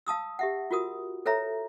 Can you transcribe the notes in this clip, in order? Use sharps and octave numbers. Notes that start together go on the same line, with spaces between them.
F5 A5 D#6 E6
G4 E5 F#5
F4 F#4 A#4 D#6
A4 B4 C#5 E5 A#5